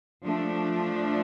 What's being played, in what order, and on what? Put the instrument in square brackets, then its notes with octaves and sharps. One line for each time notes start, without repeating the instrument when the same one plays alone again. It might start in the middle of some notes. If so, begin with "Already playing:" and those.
[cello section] F3 A3 D4